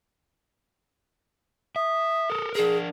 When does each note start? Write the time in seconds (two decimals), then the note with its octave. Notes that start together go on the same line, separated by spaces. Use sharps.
1.76 E5 D#6
2.30 A4 A#4
2.55 D4 G#4 A#4